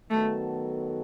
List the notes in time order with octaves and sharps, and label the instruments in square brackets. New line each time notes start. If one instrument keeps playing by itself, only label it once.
[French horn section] D#3 F#3 B3 F#4 A4 [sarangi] A3